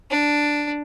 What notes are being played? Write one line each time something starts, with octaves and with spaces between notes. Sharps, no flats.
D4